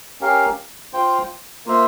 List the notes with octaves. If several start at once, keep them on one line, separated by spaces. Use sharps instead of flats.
C#4 G4 A#4 F5
F4 C5 G5
A#3 F4 C5 E5